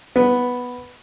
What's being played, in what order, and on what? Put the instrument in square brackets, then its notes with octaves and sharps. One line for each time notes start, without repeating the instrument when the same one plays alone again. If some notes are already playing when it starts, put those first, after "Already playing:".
[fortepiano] B3